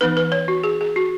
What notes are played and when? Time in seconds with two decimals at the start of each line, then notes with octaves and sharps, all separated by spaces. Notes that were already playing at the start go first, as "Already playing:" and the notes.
0.01 E3 B3 D#4 B4
0.17 B4
0.32 C#5
0.48 F#4
0.64 G#4
0.81 G#4
0.96 F#4